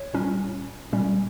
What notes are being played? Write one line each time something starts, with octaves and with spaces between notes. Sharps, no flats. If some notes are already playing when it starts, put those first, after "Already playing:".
Already playing: C#5
A#2 G3 C#4
A#2 G3 C#4